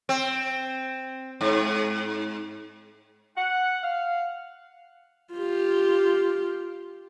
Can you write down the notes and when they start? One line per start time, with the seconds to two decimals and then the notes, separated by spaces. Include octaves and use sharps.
0.09 C4
1.41 G#2
3.36 F#5
3.83 F5
5.34 F4 G4